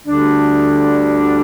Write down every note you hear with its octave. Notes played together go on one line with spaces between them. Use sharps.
D2 D3 G3 D4